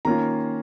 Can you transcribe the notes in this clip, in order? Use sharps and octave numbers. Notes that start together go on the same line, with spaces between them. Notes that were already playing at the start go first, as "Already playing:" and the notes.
D#3 A#3 C#4 F4 A#5